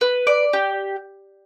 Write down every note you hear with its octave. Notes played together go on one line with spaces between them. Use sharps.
B4
D5
G4